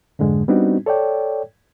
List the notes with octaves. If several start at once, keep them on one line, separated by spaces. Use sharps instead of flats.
F2 G#2 D3 G#3
G3 B3 C4 D4 D#4 F#4
A4 C#5 D5 G5